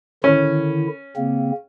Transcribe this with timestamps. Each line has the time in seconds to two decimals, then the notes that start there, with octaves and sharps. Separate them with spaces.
0.24 D3 D#3 C#4 E4
1.16 C#3 A#3 C4